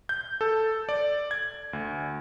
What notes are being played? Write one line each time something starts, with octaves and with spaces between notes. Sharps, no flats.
G6
A4
D5
G#6
D2